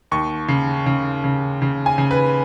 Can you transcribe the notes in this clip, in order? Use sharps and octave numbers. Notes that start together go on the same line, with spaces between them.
D#2 C#6
C#3
C#3
C#3
C#3
G#5
C#3
B4